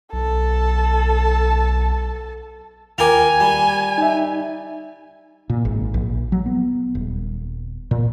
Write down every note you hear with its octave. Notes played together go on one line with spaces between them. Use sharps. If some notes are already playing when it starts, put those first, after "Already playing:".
B1 A4 A5
D#2 F4 A#4 G5 G#5 D6
G3
D#4 E5
A#2
G#1
A#1
F#3
B3
D#1
A#2